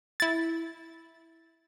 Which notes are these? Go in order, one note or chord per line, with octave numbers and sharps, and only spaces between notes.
E4 A6